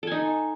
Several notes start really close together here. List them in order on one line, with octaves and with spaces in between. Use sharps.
A4 G#5 D#4